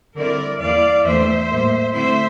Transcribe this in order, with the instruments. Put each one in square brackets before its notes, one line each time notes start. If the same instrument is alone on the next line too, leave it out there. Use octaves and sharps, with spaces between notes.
[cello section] D3 G3 C4 E4 A#4 D5
E2 E3 A#3 E4 D5 F5
E2 E3 A3 D4 C5 E5
A2 G3 A#3
D3 A3 C4 E4 C5 E5